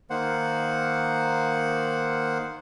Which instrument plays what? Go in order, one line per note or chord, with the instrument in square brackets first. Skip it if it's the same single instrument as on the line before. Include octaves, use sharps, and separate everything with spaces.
[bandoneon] D#3 A#3 C5 F#5